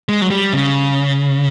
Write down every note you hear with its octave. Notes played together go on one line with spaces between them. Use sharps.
G#3
F#3
G3
C#3